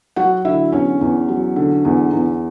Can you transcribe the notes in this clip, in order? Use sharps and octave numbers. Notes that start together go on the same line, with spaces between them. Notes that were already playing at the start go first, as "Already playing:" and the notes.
F#3 F#4 F#5
D3 E4 E5
E2 C#4 C#5
E2
F#3
D3
E2
E2